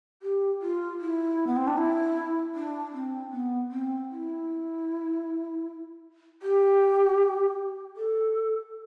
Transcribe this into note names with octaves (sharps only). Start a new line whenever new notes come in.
G4
F4
E4
B3
C4
D4
E4
D4
C4
B3
C4
E4
G4
A4